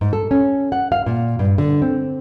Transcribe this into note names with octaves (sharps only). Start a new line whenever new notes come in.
G#2
A4
C#4
F#5
F5
A#2
G2
D3
C4